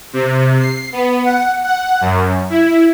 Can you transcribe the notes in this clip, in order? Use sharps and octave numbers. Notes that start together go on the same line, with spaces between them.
C3
C7
B3
F#5
F#5
F#2
E4